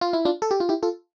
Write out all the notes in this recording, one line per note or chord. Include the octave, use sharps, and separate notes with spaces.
F4
E4
D4 F4
A4
G4
F4
E4 G4
F4 A4